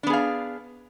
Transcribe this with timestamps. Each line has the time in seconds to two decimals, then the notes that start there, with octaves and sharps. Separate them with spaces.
0.03 D4
0.07 B3
0.10 G#4
0.13 F5